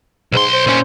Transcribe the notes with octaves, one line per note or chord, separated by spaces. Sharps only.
B1 G#2 C6
C5
A#2 C#4